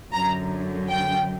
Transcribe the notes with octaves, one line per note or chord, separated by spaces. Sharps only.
F#2 D3 A#5
G5